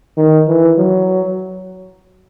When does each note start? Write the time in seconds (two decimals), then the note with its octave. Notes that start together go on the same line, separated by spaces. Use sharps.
0.17 D#3
0.48 E3
0.78 F#3